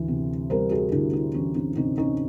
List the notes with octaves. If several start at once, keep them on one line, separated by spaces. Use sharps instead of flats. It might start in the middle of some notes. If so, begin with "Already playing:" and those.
Already playing: D2 E3
C3
G3 A#4 C5
F#4 G#4
D2 D4 E4
D4 E4
E3 C#4
C4 D4
C3 C#4 D#4
C#4 D#4